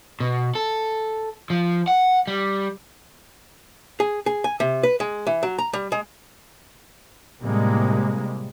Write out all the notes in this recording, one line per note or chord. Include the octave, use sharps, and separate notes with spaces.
B2
A4
F3
F#5
G3
G#4
G#4
G#5
C3
B4
G#3
E3
F#3
A#5
G3
G#3
A2 C3 G3 G#3 A#3